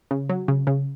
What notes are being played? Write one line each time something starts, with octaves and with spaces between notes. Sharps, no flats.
C#3
F#3
C#3
C#3